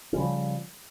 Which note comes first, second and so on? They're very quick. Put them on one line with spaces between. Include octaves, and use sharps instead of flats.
C#4 C#3 G3 F3